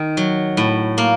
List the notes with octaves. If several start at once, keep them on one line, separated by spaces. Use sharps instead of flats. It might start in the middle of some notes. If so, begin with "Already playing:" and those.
Already playing: D#3
F#3
A2
A#3